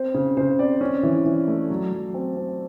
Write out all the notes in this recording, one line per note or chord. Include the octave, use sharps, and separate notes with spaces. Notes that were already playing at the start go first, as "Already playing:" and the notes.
Already playing: C4 C5
C#3
C#3 C5
C4 D5
C#4
E3
E3
A3
F#3
F#3
C4
C4